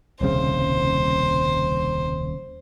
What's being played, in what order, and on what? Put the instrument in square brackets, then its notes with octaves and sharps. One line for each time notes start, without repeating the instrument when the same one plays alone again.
[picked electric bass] D#1 C2 C#3 [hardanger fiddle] C5